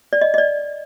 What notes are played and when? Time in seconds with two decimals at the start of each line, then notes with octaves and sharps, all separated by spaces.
0.13 D5
0.21 D#5
0.34 D#5
0.38 D5